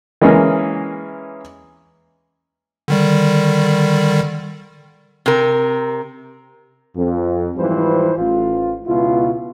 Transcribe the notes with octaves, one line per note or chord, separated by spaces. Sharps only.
E3 G#3 A#3 C#4
D3 D#3 G3
C3 A#4
F2
G#2 E3 F3 G3 B4 C5
A1 F4
C#2 B2 E4 F4